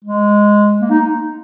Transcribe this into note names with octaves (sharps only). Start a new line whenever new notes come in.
G#3
A#3
D#4